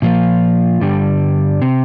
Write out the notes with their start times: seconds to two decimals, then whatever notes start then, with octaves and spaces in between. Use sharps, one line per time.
0.02 A#2 F3 A#3 F4
0.81 G2 D3 G3
1.62 C3